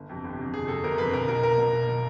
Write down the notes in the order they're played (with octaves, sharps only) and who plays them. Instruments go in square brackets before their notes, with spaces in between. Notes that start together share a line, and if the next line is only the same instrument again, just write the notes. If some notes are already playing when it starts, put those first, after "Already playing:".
Already playing: [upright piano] G1
F2 C3
G1
F2 C3
G1 G#4
F2 C3 A4
G1 A#4
F2 C3 B4
B1 A#4
B2 A#4
B1 A#4
B2
B1
B2